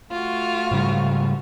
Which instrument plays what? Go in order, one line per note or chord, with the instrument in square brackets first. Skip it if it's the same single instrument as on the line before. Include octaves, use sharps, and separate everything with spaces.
[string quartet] A3 F4 F#4
[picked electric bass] G#2 C#3 G3